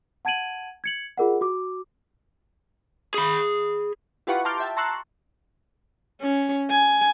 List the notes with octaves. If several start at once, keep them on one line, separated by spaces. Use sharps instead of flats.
F#5 A5 G#6 D7 D#7 F#7
G#6 C#7 F#7
F4 G#4 A#4 D#5 F#5
F#4 D6
G#4 B5
E4 F4 G4 B4 F#5 C#6
A5 A#5 C6 D6 F6 G6
E5 G5 A5
A5 A#5 C6 C#6 E6 F#6
C#4
G#5